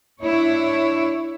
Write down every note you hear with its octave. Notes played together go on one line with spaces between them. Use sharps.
D4 E4 C#5